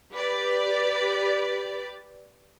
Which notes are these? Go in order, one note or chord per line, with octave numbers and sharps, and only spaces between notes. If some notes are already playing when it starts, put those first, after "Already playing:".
G4 B4 D5